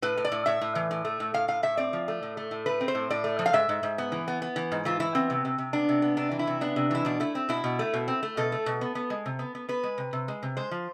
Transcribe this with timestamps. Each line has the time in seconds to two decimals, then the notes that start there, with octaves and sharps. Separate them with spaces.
0.02 A2 B4
0.18 A2
0.25 D5
0.32 A2
0.46 A2 E5
0.61 A2
0.75 E3
0.91 A2
1.05 A3
1.20 A2
1.34 A2 F5
1.48 A2 F5
1.63 A2 E5
1.77 C4 D5
1.93 F3
2.08 A3
2.23 A2
2.37 A3
2.51 A2
2.66 A3 B4
2.81 C4
2.88 C5
2.95 A2
3.10 A2 D5
3.24 A3
3.39 F3
3.46 F5
3.53 G#2 E5
3.69 G#2
3.83 G#2
3.98 B3
4.12 E3
4.28 B3
4.42 B3
4.56 E3
4.72 G#2
4.85 E3 F4
5.00 E3 E4
5.15 B3 C4
5.30 C3
5.45 C3
5.58 C3
5.73 B3 D4
5.89 C3
6.02 B3
6.17 C3 D4
6.31 E3
6.39 E4
6.47 C3
6.61 B3 D4
6.76 C3
6.91 E3 E4
7.05 B2 D4
7.20 A3 E4
7.35 C4
7.49 B2 E4
7.64 B2
7.79 A3
7.94 B2
8.08 C4
8.23 A3
8.37 B2 A4
8.52 A3
8.66 B2
8.81 B3
8.95 B3
9.10 G#3
9.26 C3
9.39 B3
9.55 B3
9.69 B3 B4
9.83 G#3
9.98 C3
10.13 C3
10.28 G#3
10.43 C3
10.57 G#3 C5
10.71 F3